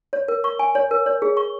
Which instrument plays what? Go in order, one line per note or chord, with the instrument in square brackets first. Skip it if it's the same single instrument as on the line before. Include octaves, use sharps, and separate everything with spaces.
[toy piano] C#5
A#4
C#6
G#5
C#5
A#4
C#5
G#4
C#6